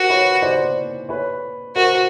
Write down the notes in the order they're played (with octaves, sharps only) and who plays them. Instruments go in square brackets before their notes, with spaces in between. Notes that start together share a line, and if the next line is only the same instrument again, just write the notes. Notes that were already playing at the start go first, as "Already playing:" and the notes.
Already playing: [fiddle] F#4 [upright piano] A#4 C5
[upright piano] B4 C#5
C5 D5
B4 C#5
[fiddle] F#4 [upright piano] A#4 C5